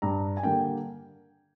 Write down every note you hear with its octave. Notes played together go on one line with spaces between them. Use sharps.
G2 A#5
G#5
D3 G3 A#3 D4 G5